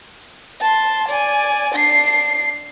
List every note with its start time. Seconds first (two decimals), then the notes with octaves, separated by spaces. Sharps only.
0.61 A5 C6
1.08 D5 G#5
1.74 D4 C7